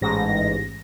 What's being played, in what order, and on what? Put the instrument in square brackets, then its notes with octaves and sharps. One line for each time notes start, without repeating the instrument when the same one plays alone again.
[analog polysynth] A1 G#2 A#6